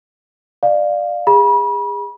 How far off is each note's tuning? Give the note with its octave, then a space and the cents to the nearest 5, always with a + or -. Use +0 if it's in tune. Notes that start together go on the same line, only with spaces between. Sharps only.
D5 +25 F5 +0
G#4 -30 B5 -35